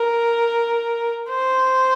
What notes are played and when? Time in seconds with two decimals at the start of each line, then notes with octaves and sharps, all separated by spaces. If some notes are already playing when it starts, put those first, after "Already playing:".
Already playing: A#4
1.29 C5